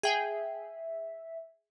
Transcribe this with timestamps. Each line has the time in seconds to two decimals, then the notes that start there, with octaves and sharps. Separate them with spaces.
0.03 G#4 E5 G5 G#5